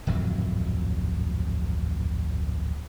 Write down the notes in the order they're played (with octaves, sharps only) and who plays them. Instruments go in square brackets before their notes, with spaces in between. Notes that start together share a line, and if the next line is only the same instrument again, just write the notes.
[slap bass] D1 G#1 F2 F#3